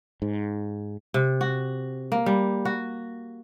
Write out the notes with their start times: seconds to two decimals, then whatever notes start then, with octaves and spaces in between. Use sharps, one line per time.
0.22 G#2
1.14 C3
1.41 F#4
2.12 A#3
2.26 G3
2.65 F#4